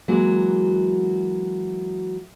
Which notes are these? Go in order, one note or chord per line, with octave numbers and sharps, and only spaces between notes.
E3 F#3 G#3 A#3 F#4